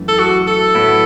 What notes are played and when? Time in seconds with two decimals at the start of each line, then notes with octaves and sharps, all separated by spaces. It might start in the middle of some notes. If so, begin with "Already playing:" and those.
Already playing: F#2 E3 A3
0.08 A4
0.19 F#4
0.47 A4
0.75 A2 F#3 B3 E4